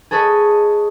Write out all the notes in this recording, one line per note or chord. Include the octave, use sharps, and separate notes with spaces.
G#4 A4 B4 C#5 D#5